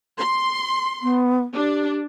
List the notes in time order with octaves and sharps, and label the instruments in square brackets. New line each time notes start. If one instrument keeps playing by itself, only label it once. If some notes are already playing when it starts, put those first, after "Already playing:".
[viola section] C6
[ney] B3
[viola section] D4 [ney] G4